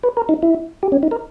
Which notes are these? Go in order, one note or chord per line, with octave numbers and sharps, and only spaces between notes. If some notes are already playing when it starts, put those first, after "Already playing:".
B4
A#4
D#4
E4
G4
C#4
D#4
A#4